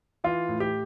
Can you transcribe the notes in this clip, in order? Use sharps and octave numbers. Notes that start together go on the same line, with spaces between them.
E3 F4
A2
G4